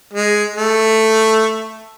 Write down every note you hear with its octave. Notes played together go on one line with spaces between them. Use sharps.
G#3
A3